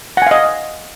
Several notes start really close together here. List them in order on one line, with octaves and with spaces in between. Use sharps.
F#5 G#5 F5 D#5